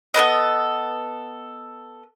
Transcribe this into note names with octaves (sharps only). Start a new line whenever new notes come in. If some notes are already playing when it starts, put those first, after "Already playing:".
B3 A4 B4 D#5